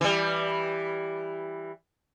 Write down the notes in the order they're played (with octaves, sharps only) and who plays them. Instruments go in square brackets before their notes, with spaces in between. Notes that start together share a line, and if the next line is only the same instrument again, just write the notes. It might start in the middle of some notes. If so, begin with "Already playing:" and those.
[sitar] E3 G3